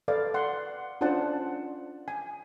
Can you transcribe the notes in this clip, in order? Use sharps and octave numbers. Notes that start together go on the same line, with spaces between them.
A4 B4 D5 F5
F#5 C6
C#4 D4 F4 C5 F#5 A5
G#5